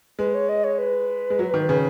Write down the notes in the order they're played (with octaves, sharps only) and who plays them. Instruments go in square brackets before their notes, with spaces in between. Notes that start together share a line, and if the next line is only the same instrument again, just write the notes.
[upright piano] G#3 [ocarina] B4
[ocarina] C#5
D#5
C#5
B4
[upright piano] G#3
F#3
D#3
C#3